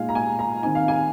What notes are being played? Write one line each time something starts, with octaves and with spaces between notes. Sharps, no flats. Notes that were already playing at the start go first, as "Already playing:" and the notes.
Already playing: A#2 G#3 D#4 F5 G#5
A#5
G#5
A#5
D#3 C4 D#4 G#5
F5
G#5